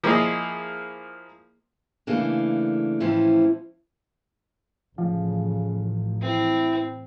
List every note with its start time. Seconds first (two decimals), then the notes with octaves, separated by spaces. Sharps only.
0.04 F3 A#3 E4 F4 G#4 D#5
2.07 C#3 E3 A3 A#3 D4
3.00 A2 E3 F3 C4 C#4 E4
4.98 A1 C#3 F3
6.22 C4 E4